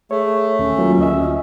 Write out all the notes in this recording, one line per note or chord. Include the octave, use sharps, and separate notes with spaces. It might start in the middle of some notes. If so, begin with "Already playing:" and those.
A3 G#4 C#5
D#2 C#4
F#3 A#3 F4
D2 D#5 E5